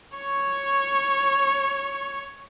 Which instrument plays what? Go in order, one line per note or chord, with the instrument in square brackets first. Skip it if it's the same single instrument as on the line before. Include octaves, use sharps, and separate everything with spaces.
[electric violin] C#5 C#6